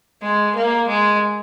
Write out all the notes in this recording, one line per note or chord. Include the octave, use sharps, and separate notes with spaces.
G#3
A#3
G#3